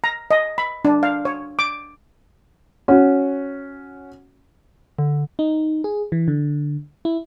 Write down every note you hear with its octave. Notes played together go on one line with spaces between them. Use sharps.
A#5
D#5
B5
D4
F5
C#5
D6
C#4 F#4
D3
D#4
G#4
E3
D3
E4